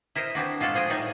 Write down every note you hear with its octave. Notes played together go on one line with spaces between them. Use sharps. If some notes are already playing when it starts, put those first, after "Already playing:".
E4 A#4 C5 D#5
B3 C4 D4 F#4
G#3 F4 F#4 A4
A#2 F3 G#4 C5 D#5 G5
A2 G3 D#4 D5 G5 G#5